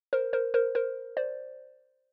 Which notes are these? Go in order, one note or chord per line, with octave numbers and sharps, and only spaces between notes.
A#4 C5
A#4 C5
A#4 C5
A#4 C5
C5 D5